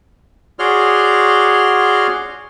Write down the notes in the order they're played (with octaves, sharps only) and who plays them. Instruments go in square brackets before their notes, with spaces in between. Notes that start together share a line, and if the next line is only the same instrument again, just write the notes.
[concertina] F#4 G#4 C#5 D5 C6 F6